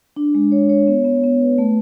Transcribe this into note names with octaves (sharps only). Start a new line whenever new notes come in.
D4
G#3
C#5
C#5
B3
B3
B3
B4
A3